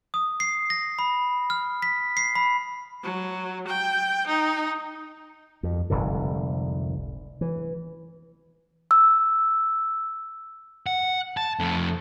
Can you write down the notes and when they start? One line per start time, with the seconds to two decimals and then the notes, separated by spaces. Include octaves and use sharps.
0.14 D#6
0.40 C7
0.70 A#6
0.99 B5
1.50 F6
1.82 B6
2.17 C7
2.35 B5
3.03 F#3
3.67 G5
4.27 D#4
5.63 F2
5.90 F1 C2 G#2 D3
7.41 E3
8.91 E6
10.86 F#5
11.37 A5
11.59 F2 A3